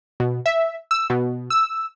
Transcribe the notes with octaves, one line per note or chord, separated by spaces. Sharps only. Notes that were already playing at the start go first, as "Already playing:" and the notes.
B2
E5
E6
B2
E6